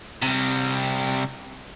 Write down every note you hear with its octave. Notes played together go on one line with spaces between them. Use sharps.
C3 G3